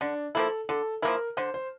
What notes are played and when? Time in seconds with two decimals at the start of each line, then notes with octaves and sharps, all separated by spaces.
0.01 D3 D4
0.35 F3 A#3 E4 A4
0.69 D3 A4
1.02 F3 A#3 E4 A#4
1.37 D3 C5
1.54 C5